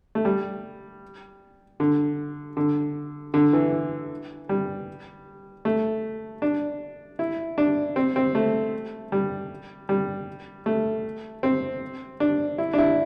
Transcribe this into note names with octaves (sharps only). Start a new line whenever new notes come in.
A3
G3
D3
D3
D3
E3
G3
A3
D4
E4
D4
C4
C4
A3
G3
G3
A3
C4
D4
E4
D4
E4